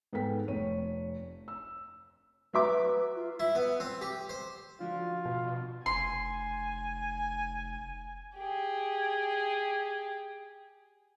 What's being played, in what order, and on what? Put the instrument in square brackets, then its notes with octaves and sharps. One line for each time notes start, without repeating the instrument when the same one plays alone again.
[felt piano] G#2 B3 G#4 A4 G5 B6
F1 C#5 D#7
E6
[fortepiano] F#3 E5 D6 [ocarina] B4
[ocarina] F4
[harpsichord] E4
B3
C4
G4
C5
[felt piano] D3 F3 F#4 [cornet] F4
[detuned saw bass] B2
[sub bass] F1 [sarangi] G#5 [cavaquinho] C6
[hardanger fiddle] G4 G#4